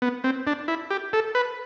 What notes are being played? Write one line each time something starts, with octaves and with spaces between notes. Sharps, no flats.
B3
C4
D4
E4
G4
A4
B4